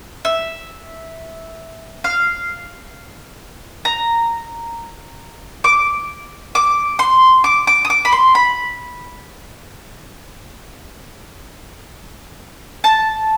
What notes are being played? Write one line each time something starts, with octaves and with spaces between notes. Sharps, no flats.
E5
F5
A#5
D6
D6
C6
D6
D6
D#6
D6
B5
C6
B5
A5